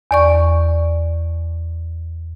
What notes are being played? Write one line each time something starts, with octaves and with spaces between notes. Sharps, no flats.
E2 D5 C#6